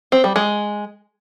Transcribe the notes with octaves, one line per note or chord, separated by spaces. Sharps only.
C4
G3
G#3